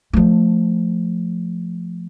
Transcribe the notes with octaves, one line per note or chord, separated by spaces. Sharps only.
F3 A3